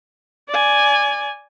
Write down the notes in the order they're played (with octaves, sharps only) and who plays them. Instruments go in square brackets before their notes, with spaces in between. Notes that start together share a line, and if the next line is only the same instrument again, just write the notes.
[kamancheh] D5 G#5